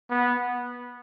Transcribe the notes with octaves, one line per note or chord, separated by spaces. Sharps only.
B3